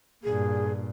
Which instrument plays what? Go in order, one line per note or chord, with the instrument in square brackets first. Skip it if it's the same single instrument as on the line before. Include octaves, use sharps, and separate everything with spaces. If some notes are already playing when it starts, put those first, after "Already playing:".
[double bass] G2 A#2 [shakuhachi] G#4